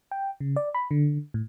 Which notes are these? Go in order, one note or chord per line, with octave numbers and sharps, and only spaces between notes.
G5
C#3
D5
B5
D3
A2